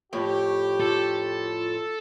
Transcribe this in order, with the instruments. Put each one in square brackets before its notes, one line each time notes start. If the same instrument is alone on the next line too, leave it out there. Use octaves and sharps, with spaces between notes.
[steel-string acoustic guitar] F2 A2 C#5 [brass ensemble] G4
[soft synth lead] F4 [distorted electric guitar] A4